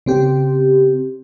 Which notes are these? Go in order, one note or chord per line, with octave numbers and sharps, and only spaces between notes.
C#3 C4 G4